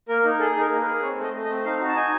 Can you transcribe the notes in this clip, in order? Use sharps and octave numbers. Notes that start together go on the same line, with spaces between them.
A#3 A#4
D#4
G#4 A4
D#4
A#4
A#3
B4
G#4
C4 C#5
A3
D#5
A3
D#5
C4
D#4 F5
F#4
A5
D#4 G#5